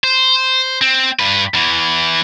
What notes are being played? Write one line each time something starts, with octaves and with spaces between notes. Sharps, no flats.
C5
C4
G2 B4
E2 E3